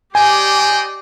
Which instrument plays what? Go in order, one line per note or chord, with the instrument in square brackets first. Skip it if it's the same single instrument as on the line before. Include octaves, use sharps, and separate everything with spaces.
[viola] G4 D5 [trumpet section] C5 D#5 G5 [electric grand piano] G#5